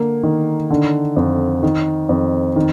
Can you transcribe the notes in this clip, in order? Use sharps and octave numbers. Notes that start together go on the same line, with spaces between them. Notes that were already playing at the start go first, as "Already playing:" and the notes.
Already playing: D3 A#3
D#3
D3
F2
D#3
F2
D#3